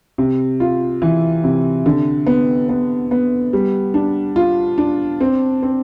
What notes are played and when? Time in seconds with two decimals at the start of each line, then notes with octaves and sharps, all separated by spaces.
0.18 C3
0.60 F4
1.02 E3
1.44 C3
1.86 D3
2.26 B3
2.69 B3
3.11 B3
3.53 G3
3.94 D4
4.36 F4
4.78 D4
5.21 C4
5.63 C4